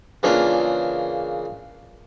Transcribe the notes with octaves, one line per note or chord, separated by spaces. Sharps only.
C#3 E3 A#3 D4 F4